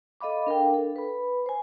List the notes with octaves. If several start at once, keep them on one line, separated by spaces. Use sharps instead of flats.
A4 D#5 F5 B5 D6
D4 A#4 F5 G5
D4 A4
B4 B5
C5 G#5